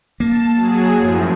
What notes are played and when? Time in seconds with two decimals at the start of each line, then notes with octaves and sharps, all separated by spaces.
0.20 A#3 A5
0.54 F#3 G#4
0.96 F#2 A2 F3